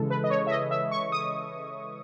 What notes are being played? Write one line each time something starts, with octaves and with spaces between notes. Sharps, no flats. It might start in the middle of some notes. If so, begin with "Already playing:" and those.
Already playing: C#3 E3 G#3 A4
B4
D#5
C#5
E5
D#5
E5
C#6
D#6